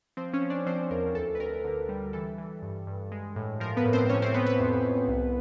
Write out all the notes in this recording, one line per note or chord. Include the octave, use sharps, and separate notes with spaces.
F3 C4 C5
C#4 C#5
F3
D4 D5
F3 C4 C5
E2 A#4
D2 A4
B4
D2 A#4
D3
G3
E3 A4
E3
G2
G2
G#3
A2
F3 A#4
B3 B4
A2
C4 C5
C3 C#4 C#5
C4 C5
C3 B3 B4
B3 B4
F2
F2
C2